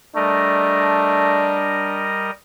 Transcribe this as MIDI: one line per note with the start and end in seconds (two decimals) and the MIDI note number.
0.16 2.31 55
0.16 1.61 57
0.16 2.09 62
0.16 2.31 70
0.16 2.31 75